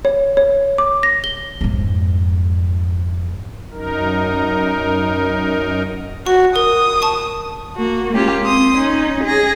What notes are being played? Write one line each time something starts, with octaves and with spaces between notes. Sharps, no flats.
C#5
C#5
D6
A#6
G7
F2 G#2
F#2 D#4 A#4
F#4 C#6
A#4 D#6
A5 C#6
A#3 F#4
G#3 A#3 C#4 F4 G4
C4 C6 D#6
C#4 D#4
G#4 A#6